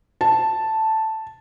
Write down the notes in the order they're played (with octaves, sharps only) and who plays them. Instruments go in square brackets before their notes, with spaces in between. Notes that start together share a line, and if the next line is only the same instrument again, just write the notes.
[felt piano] A5